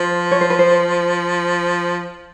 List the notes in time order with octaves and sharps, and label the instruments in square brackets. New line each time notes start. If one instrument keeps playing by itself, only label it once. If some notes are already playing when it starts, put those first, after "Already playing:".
Already playing: [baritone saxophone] F3 [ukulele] C5
[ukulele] C#5
C5
B4
C5